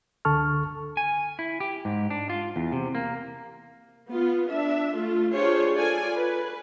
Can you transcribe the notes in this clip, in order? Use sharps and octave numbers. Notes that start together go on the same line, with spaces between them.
C#2 D3 A4 A5 C#6 F6
G#5
E4
G4
G#2
D4
F4
E2
C3
A#3
B3 F4
D4 E5
A3 F4
D4 F4 G4 G#4 C5 C#5
F4 A4 D5 G#5
B4